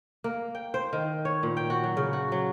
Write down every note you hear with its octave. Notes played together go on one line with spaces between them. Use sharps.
A#3
G5
C5
D#3
C#5
A#2
G5
F#4
F#3
C#3
F#4
F#3